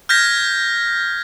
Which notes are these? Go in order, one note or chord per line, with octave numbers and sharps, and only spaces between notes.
F6 G6 G#6 A#6 B6